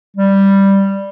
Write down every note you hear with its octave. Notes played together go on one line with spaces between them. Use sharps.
G3